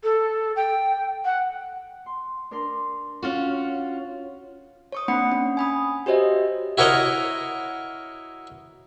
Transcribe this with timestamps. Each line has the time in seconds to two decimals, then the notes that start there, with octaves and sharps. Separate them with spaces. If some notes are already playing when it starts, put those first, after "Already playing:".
0.04 A4
0.56 G5
1.25 F#5
2.06 C6
2.51 D4 A#4 C6
3.23 C#4 F4 F#4
4.92 C#5 C#6 D#6
5.08 A#3 C4 D4 F#5 B5 C#7
5.32 C#4
5.57 G#5 B5 D#6
6.06 F#4 G4 C5 C#5 D#5 E5
6.78 E4 F#4 A#4 C#5 D#5